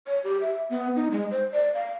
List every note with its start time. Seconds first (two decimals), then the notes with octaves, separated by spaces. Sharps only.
0.07 C#5
0.24 G4
0.41 E5
0.70 B3
0.96 D#4
1.11 G#3
1.31 C5
1.52 D5
1.74 F5